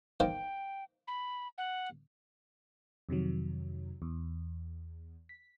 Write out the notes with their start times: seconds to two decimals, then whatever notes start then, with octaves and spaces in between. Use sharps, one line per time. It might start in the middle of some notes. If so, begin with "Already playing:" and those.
0.20 D#3 A#3 C5 G5
1.08 B5
1.58 F#5
3.09 F2 C3 D#3 F#3
4.02 E2
5.29 B6